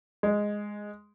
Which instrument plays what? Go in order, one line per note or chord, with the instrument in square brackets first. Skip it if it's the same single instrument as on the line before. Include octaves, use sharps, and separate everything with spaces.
[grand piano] G#3